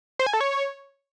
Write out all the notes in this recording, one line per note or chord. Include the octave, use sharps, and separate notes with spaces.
C5
G#5
A4
C#5